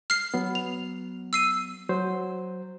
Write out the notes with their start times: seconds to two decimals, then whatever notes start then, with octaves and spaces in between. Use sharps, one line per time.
0.10 F6 C7
0.34 F#3 B3
0.55 F7
1.33 E6 C7 D#7
1.89 F#3 C5